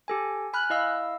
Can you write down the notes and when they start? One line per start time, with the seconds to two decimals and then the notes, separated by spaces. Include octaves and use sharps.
0.08 G4 A4 G#5
0.53 G#5 B5 F6 F#6
0.70 E4 D#5 F5 E6